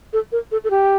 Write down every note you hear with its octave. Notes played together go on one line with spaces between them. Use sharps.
A4
A#4
A4
A4
G4